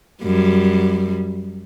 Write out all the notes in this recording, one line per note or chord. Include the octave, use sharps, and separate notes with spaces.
F#2 G3